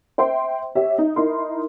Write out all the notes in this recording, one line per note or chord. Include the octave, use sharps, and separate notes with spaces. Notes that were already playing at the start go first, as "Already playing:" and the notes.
C5 E5 G5 C6
G4 C#5 E5
D#4
D#4 E4 A#4 C6